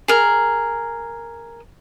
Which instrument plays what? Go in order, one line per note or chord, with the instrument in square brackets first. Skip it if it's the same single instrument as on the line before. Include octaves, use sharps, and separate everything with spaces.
[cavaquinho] G#4 A#4